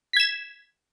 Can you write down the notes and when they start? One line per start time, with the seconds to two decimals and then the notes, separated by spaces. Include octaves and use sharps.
0.13 B6
0.17 G#6
0.20 E7